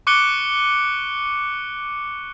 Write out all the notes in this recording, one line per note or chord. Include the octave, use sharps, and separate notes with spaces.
C#6 D6 F#6 C#7 D7 G7